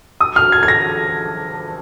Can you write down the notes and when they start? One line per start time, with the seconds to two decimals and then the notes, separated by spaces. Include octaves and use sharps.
0.21 D#6
0.36 F6
0.52 G#6
0.63 G#6
0.68 A#6